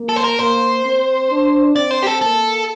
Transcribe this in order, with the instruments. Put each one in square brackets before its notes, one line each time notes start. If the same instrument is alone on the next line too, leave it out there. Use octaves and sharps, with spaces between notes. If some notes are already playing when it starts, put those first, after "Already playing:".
Already playing: [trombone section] A#3
[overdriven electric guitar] A4
C5
A#4
[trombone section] A#3 [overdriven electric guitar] C5
[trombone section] C4
D4
[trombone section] C4 [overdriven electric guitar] D5
[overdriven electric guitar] C5
G4
A4
[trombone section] A#3 [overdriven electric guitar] A4